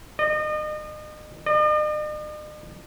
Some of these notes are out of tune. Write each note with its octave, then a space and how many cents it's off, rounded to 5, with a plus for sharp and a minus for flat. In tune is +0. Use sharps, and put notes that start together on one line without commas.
D#5 -35
D#5 -45